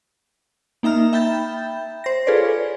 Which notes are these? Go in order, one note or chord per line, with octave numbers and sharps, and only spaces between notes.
A#3 D#4 E5 A#5 F6
E5 G5 B5 G6 A6
C5 A#6
F4 G#4 A4 B4 C#5 D5